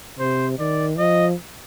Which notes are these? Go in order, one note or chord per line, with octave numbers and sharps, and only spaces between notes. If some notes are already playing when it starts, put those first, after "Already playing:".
C3 C5
D#3 D5
F3 D#5